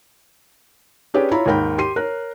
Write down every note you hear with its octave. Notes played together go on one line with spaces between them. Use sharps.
C#4 D4 G4 G#4 B4 D5
E4 F4 C#5 A#5 B5
D#2 G#2 A#4 G5 B5
G4 C6 C7 D#7
A#4 C#5 F#6